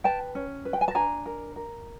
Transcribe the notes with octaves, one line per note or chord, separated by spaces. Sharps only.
B4 G5 A5
C#4
B4
G5
G#5
A5
D4 G#5 A#5
A#4
A#4